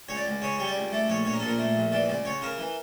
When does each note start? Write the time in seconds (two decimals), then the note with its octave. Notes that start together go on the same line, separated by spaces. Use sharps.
0.08 C#2 C#5
0.17 D5
0.26 C#2
0.42 C#3 C#5
0.58 G3 C#5
0.67 D5
0.76 C#2
0.92 A3 D5
1.08 A#1 C#5
1.25 A#1 C#5
1.33 A#4
1.40 A4
1.43 A#2
1.48 A#4
1.58 A3
1.76 A#1
1.92 E3 D5
2.08 C#2 D5
2.25 C#2 C#5
2.42 C#3 A#4
2.58 E3